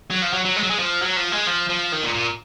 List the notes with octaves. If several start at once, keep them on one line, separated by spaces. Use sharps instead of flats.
F#3
F3
F#3
F#3
G#3
F#3
G#3
F3
F#3
F3
G#3
F3
F3
D#3
A#2
A#2